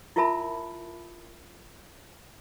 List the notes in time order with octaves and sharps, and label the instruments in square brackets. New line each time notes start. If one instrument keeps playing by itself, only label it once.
[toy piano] E4 F4 A#4 E5 A5 B5